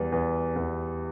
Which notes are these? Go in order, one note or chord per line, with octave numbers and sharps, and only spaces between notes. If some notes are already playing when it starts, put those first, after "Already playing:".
Already playing: E2 G3
E2
E2